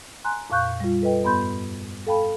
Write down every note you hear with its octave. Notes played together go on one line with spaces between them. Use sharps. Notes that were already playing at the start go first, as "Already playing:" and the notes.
G#5 A#5 C6 F#6
F2 A#2 F5 C#6 F#6 G6
G3 F4
A4 B4 D#5 G5
G2 B3 B5 C6 G6
A4 F5 G5 A5 B5